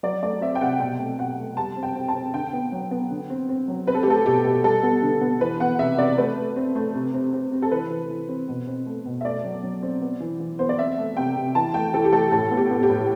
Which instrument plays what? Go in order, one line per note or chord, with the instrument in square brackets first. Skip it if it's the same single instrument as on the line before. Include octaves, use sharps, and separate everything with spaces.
[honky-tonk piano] F#3 D5
A3 D5
C4 E5
G5
C3 F#5
B2 G5
A3
B2 F#5
A3
G3 A5
C4
G5
C4
A5
C4
D3 G5
B3
F#3
B3
D3
C4
C4
F#3
C4 B4
A4
G4
A3 A4
B2 G4
B2
G3 A4
B3
D3
B3
E3 B4
B3 F#5
C3 E5
C3 D5
A3 B4
A3
C4
A3
C3
C4
C4
C4
A4
E3 B4
E3
E3
C4
B2
C4
A3
B2
E5
A3 D5
F#3
F#3
C4
B3
E3
E3
B3 C5
D5
C4 E5
A3
C3 G5
C3
E3 A5
A3 G5
E3 A4
G4
A3 A4
A2 A4
B3
G4
B3
G4
A2